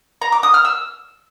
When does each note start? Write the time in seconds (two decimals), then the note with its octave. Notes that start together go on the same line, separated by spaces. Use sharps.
0.22 A#5
0.32 D6
0.43 D#6
0.54 F6
0.65 E6